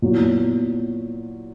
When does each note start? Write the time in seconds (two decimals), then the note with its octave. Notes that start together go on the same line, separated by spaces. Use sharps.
0.02 A#2 F#3 B3 E4